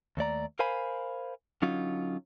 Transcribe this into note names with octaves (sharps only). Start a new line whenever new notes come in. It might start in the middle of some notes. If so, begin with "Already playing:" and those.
D#2 A3 D5 A#5
A#4 C5 F5 G#5 B5
D3 F#3 C#4 D#4 F4